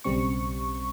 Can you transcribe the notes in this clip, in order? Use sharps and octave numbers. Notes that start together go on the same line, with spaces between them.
B1 C#3 G3 C4 C#6